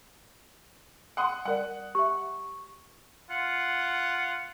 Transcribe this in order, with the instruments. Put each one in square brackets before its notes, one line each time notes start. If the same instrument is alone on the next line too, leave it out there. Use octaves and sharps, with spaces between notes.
[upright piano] F#5 C6 D#6
[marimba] G3 A#4 D5 [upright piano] F#5
[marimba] G4 E5 [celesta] C#6
[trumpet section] F4 F#5